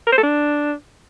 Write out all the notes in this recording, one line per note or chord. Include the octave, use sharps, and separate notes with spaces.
A#4
C5
A4
D4